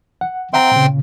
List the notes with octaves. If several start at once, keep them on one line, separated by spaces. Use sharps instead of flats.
F#5
C4 E5 F#5 G5 A#5 C6
A#2 C#3